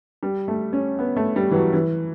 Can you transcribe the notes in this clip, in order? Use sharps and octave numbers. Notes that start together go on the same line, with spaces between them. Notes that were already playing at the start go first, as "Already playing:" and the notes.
G3
A3
C#4
B3
A3
G3
E3
F#3
E3